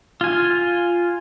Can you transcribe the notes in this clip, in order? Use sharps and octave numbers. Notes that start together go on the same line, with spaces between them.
F4 G#5